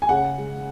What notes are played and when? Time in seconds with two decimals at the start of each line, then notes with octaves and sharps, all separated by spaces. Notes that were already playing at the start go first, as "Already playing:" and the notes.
0.02 G#5
0.09 C#3 F#5
0.38 G#3